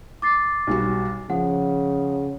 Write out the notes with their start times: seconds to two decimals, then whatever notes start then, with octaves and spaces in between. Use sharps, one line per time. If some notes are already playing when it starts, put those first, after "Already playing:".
0.22 D6 A6 C7
0.67 B1 G3 F#4
1.30 C#3 F3 F#5